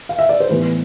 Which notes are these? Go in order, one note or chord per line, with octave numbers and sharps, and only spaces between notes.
F5
E5
D5
C5
A2 E3 G3 B3 B4